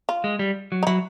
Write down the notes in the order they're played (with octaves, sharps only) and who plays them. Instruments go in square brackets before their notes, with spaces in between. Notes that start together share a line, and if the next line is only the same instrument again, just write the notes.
[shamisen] F4
[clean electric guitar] G#3
G3
F#3
[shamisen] D#4
[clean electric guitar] F#3 [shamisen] E4